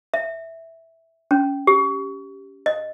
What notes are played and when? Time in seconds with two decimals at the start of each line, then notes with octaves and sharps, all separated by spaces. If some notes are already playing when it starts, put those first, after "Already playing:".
0.14 E5
1.31 C#4
1.67 G4
2.66 D#5